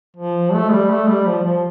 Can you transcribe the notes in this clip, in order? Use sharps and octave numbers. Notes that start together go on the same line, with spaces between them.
F3
A3
G3
A3
G3
F3
F3